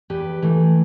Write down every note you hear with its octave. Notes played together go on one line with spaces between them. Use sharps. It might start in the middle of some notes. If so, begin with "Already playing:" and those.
E2 G4 B4
E3 A3